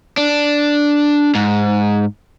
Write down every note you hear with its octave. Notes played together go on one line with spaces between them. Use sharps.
D4
G#2